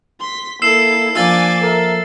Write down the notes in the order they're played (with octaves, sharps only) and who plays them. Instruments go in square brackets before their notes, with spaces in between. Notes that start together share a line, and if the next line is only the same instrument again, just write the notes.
[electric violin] C6 B6
[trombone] A#3 [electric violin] E4 A4 [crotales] E6 C7 E7
[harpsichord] F3 A#3 F4 [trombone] D4 [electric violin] G#5 D6 [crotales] E6 A6
[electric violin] A4 E5 [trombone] A#4